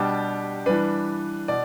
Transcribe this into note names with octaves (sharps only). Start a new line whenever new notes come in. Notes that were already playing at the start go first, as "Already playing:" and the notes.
Already playing: B2 G3 D4 G4
E3 G3 D4 B4
B2 D5